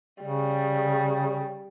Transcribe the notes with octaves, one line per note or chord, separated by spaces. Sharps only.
C#3 G3